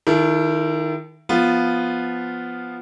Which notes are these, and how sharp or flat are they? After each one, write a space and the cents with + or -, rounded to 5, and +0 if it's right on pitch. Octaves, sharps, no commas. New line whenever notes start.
D#3 +0 E4 +30 A4 -35
F3 +0 B3 +0 F4 +0